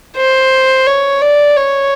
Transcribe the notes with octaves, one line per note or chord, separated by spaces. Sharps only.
C5
C#5
D5
C#5